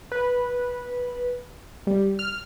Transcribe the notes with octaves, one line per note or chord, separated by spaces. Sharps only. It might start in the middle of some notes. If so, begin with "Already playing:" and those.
B4
G3
F6